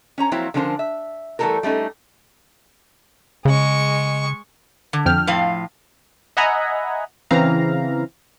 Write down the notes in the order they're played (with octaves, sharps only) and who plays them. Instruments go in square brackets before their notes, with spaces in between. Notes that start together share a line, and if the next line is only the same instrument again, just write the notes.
[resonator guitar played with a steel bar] C#4 C#5 A#5
F3 F#3 A#3 C4 E4 C#5
D3 F3 C#4 D4 A#4 C5
E5
E3 G3 A3 G4 A4 A#4
G3 A3 C#4 D#4
[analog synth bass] C#3 [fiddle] G#3 C#6
[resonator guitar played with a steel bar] D3
[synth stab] F2 G5 F6
[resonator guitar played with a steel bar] A2 F3 F5
[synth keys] D#5 E5 F#5 G#5 A#5 B5
C#3 E3 C4 F5 A#5